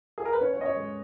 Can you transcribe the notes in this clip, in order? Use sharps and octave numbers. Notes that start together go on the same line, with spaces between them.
G#4
A#4
B4
C#4 C#5
C#5
C#4 D#5
C#5
G#3